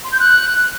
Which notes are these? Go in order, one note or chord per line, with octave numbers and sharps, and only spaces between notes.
C6
G6
F#6